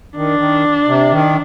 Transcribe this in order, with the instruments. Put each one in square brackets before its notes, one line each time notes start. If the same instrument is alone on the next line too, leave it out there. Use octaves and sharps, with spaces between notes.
[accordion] D#3 [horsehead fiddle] D4
[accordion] D#3
C3
D#3